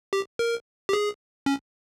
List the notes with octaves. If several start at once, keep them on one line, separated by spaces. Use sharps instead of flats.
G4
A#4
G4
G#4
C#4